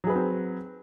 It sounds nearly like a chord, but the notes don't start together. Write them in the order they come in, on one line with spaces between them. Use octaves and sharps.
F#3 G#4 B4 F#4 C4